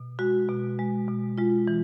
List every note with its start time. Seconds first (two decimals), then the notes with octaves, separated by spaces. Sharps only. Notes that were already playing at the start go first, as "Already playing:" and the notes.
Already playing: B2
0.19 G#3 F#4
0.49 B2
0.79 G#3
1.08 B2
1.38 G#3 F4
1.68 E3